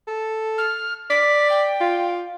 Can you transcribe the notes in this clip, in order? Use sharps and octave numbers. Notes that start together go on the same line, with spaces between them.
A4
F6
D5 B6
G5
F4